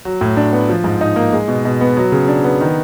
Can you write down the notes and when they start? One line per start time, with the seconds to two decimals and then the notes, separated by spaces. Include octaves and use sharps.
0.05 F#3
0.21 A2
0.37 D4
0.53 B3
0.69 F3
0.84 G#2
1.01 D#4
1.16 A#3
1.33 G#3
1.48 B2
1.65 B2
1.81 B3
1.97 F#3
2.12 C#3
2.28 D4
2.44 B3
2.61 D#3